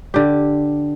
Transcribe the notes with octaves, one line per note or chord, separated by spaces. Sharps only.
D3 G4